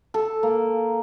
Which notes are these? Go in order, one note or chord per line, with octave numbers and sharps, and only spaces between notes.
A4
A#3